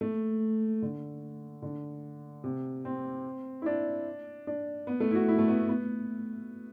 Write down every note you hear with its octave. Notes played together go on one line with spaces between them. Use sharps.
A3
D3
D3
C3
C4
E4
D4
D4
B3
A3
E4
F#4
E4
A3
B3
B3